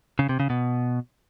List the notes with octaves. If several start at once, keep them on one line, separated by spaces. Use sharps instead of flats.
C#3
C3
C#3
B2